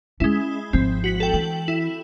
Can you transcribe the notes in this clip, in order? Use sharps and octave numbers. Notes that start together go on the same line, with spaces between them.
G#3 C#4 E4
G#1 F3 C4
F#4 B6 F#7
A4 G5
E3 F#7
E4